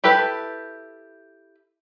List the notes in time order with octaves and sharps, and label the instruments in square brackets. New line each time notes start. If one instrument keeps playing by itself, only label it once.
[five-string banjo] E4 G4 A4 B4